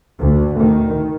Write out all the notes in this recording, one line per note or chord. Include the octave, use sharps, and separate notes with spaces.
D2
D#3